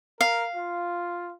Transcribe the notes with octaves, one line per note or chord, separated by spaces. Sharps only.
A#4 F5
F4